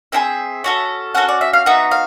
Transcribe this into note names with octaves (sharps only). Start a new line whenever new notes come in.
C4 E4 G#4 E5
C#4 F#4 A4
C#4 F#4 A4 F#5
D5
E5
F5
B3 D#4 F#4 E5
F5